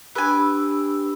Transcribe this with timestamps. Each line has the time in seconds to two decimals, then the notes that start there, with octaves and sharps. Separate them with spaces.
0.15 D4 G4 B4 G#5 B5 E6